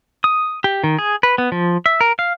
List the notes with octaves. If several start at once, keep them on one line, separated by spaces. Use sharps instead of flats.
D#6
G4
D#3
G#4
B4
B3
F3
E5
A#4
F5